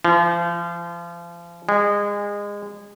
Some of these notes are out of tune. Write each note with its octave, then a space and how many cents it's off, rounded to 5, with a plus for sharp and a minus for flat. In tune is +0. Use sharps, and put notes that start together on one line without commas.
F3 -35
G#3 -25